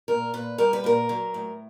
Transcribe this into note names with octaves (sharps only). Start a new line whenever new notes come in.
A#2 A#4
A#2 B4
G3 A#4
B4
A#2 A#4
F#3
A2